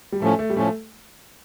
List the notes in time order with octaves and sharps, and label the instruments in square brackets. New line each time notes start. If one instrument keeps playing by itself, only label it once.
[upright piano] G3
[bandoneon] A2 F3 C#4 [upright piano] A3
[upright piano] A3
G3
[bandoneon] A2 F3 C#4 [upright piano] A3